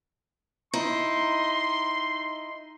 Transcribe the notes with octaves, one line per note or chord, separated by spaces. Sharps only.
D#4 E4 C6